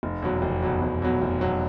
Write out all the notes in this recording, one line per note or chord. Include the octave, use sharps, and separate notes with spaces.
F1
E2 B2 F#3
F1
E2 B2 F#3
F1
E2 B2 F#3
F1
E2 B2 F#3